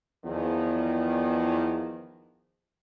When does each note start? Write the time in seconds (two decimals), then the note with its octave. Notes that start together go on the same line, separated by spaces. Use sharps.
0.25 E2 D#3 F3